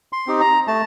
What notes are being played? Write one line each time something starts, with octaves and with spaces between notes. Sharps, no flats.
C6
C4 D#4 G4
A#5
A3 A5